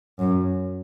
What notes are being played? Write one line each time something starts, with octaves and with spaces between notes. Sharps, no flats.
F#2